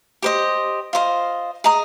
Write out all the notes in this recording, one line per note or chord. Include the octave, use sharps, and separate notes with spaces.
G4 C5 D#5
F4 C5 D#5
G#4 D#5 A#5 D#6